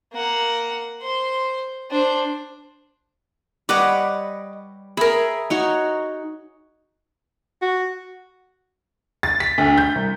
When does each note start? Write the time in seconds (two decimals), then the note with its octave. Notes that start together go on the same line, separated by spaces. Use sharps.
0.13 A#3 F#5
1.02 C5 C6
1.91 D4 C5
3.69 G3 B4 C#5 D#5 F#5 D6
4.97 G#4 A#4 E5 B5
5.50 D#4 F#4 C#5
7.62 F#4
9.23 A6
9.40 B6
9.58 D2
9.78 G6
9.95 C2